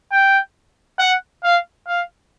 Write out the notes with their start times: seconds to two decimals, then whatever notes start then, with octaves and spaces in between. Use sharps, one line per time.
0.12 G5
0.99 F#5
1.43 F5
1.87 F5